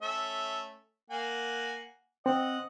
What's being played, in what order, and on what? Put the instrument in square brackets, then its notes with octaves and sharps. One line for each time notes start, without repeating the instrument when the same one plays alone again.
[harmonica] A3 C#4 E5
A#3 F#5 G#5
[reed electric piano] C4 [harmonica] D#5 F#5